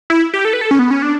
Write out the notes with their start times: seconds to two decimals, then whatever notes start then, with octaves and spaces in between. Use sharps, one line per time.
0.10 E4
0.34 G4
0.45 A4
0.53 B4
0.61 A4
0.71 C#4
0.79 B3
0.91 C#4
1.02 D4